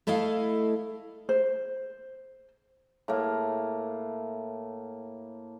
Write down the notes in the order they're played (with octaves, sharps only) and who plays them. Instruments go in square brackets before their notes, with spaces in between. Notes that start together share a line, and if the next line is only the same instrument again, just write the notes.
[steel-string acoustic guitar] A3 E4 A4 D#5 F5
[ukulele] C5
[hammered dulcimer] A2 A#3